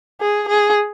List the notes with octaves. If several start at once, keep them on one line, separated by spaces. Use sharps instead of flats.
G#4
G#4